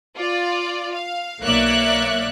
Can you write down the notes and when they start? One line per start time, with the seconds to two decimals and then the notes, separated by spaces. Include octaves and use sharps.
0.16 F4 D5
0.92 F5
1.42 B1 A#3 C#5 D5 E5 F#6